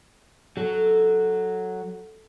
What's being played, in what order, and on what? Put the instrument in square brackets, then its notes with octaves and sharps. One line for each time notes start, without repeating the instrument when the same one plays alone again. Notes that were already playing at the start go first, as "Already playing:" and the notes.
[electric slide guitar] F#3 [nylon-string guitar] A4